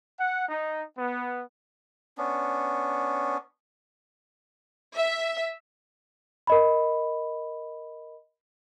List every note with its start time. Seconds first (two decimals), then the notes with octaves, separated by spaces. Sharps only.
0.19 F#5
0.48 D#4
0.98 B3
2.18 B3 C#4 D4
4.95 E5
6.47 A#4 D#5 B5